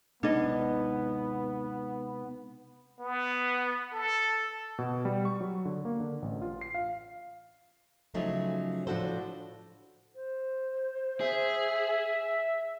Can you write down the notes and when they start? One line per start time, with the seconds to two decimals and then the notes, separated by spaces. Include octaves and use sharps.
0.23 C3 G#3 B3 D4 D#4 D#5
3.00 B3
3.93 A4
4.78 B2
5.05 G3
5.25 C#6
5.41 F#3
5.65 D3
5.85 A#3
6.00 D3
6.22 A1
6.42 F4
6.61 C7
6.74 F5
8.14 C#3 F3 F#3 A3 C#4 D#4
8.87 A2 F3 D4 F#4 A4 C5
10.15 C5
11.21 G#4 E5